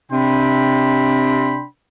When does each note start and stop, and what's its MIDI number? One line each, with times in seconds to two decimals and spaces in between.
0.12 1.65 48
0.12 1.65 62
0.12 1.65 79
0.12 1.65 83
0.12 1.65 84